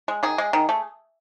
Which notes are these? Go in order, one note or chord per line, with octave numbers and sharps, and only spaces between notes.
G#3
D#3 G#4
G#3
D#3
A3